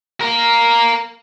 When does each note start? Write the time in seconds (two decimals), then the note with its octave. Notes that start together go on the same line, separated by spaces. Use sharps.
0.21 A#4 F5